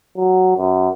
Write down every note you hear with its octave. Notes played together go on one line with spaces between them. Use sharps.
F#3
F#2